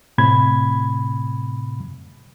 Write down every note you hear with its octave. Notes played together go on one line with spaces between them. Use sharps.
A2 C3 B5 G#6